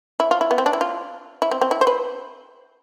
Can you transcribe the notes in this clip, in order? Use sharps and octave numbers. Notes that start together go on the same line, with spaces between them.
E4
F4
E4
B3
C4
D4
E4
F4
E4
C4
C4
E4
C5
B4